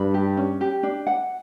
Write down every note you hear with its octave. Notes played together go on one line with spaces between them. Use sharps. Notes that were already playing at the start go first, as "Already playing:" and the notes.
Already playing: G2 B5
G4
C#4
G4
D4
F#5